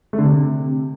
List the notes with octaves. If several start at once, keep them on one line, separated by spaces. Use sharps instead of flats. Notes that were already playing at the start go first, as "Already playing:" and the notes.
A3
D3
C3